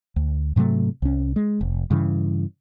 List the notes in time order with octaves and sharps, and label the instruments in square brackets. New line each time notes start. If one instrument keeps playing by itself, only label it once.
[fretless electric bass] D2
G#2 C3 F#3 A3
C2 C#4
G#3
F1
G2 C#3 E3